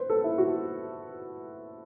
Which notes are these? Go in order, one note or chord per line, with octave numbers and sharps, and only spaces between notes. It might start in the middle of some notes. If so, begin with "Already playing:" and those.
Already playing: B4 C5
A4
E4
F#4